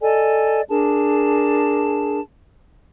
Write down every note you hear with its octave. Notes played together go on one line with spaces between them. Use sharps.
A4 D5 D#5 G#5
D4 G#4 A#4 A5